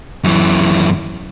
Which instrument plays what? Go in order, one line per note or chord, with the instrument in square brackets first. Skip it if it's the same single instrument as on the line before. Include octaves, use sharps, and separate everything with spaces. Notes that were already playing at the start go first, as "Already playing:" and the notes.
[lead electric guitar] F#2 E3